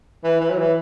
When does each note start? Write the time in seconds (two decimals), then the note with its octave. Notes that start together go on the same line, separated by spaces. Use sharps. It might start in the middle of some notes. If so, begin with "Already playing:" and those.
0.24 E3
0.40 E3
0.50 F#3
0.58 E3